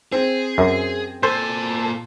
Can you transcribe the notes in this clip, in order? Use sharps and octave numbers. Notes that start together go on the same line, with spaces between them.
C4 G#4
F#2
A#2 A4 C5 G#5